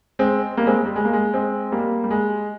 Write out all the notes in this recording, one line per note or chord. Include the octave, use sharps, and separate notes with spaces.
G#3 C4
G3 A#3
G#3 C4
G#3
G3
G#3
A#3
G#3
G#3 C4
G3 A#3
G3
G#3